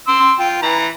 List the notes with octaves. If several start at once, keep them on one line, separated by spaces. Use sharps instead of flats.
C6 E6
F4 G5
E3 A#5 B5